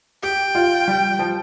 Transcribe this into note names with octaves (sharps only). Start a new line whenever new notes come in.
G4 G5
F4
G3
F3